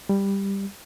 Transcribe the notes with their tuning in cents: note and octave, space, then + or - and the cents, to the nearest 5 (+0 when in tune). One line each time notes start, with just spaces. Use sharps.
G3 +10